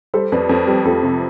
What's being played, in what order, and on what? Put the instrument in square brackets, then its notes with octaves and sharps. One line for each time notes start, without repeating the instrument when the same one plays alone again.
[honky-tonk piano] G3 [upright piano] A4 C5
[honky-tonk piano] F2 [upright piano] B4 D5
[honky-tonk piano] F2 [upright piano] A4 C5
[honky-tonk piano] G3 [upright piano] G4 B4
[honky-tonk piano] F2 [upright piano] F4 A4
[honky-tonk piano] C3